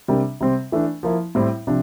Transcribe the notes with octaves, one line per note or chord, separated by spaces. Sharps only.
C3 G3 A#3 D4
C3 G3 C4
E3 A3 D4
F3 A#3 E4
A2 G3 C4 E4
C3 F3 D4